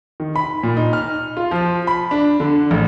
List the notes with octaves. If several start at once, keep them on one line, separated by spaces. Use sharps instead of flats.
D#3
B5
A#2
D#4
F6
F4
F3
B5
D4
D3
A1